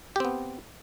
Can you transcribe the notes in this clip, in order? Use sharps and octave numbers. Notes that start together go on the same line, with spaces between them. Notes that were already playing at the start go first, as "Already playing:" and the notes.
B3 C4 G4